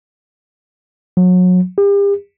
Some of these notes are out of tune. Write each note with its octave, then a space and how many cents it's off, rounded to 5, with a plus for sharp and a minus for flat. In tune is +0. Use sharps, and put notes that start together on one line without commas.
F#3 -30
G4 +40